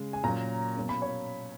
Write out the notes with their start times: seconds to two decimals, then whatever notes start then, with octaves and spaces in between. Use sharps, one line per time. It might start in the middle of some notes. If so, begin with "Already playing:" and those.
Already playing: C#3 G#3
0.13 G#5
0.23 A#2 F#3 A#3 C#4 A#5
0.77 B2 F#3 A#3 C#4
0.89 B5
1.02 C#5